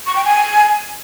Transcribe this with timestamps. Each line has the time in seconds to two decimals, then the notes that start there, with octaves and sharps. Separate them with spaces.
0.06 C#6
0.16 G5
0.25 G#5